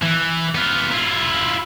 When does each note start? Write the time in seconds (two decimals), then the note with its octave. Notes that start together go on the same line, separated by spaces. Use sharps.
0.02 E3
0.56 B3 F4
0.91 E4 F4